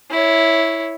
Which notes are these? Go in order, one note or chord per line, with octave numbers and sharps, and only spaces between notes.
E4 C#5